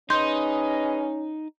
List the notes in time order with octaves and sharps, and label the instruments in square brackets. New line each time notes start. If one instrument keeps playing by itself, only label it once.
[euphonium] C#4 [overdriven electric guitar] D#4 [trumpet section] G#4 B4 D#5 [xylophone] C6 G6